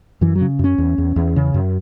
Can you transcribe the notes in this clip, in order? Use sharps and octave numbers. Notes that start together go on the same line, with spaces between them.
F#2 E3
F#3
C#3
F#2 C#4
E2
E2
E2
C#3
F#2